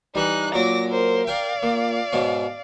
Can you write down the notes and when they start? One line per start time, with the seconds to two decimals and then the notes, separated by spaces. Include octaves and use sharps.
0.15 E3 G3 D#4 F#6
0.55 A#2 F#3 D6 A#6
0.89 A#4 C5
1.27 A#4 D5 F5 G5
1.63 A#2
2.12 G#2 B2 C#4